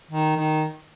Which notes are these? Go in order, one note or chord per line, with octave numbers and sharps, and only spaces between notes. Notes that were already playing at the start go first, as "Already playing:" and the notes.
D#3
D#3